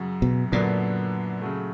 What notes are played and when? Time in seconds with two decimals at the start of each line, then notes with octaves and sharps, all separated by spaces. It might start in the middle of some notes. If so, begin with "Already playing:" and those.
Already playing: F#2 C#3 F#3
0.22 B2
0.52 F#2 A#2 D3 F#3 B3 D4
1.42 C#3 F#3 A3